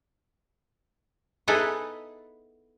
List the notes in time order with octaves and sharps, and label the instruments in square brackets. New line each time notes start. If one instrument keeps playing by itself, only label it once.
[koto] B3 D#4 E4 G#4 A4 B4